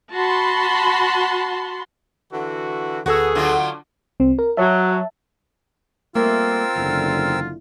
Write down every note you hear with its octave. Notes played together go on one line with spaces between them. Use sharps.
F#4 F#5 A5 B5 C6
D3 E3 F#4
D2 B3 F#4 G#4 A4 E6
D3 F#3 F4
C2 C4
A#4
F#3 E5 A5
G3 A3 A#3 C4 F4 A#4 E6
F#1 E2 D3